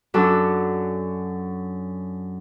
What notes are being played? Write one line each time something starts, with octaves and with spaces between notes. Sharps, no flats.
F#2 F#3 D4 A4